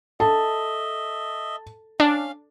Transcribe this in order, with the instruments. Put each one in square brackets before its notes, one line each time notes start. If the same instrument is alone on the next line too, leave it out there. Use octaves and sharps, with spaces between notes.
[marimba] A4 [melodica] D#5 E5 [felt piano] A5
[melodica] C#4 F5 [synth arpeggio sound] D4